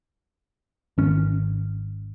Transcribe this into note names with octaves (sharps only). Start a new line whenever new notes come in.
G#1 C#4